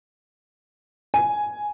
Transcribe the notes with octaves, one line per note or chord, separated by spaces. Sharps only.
G#5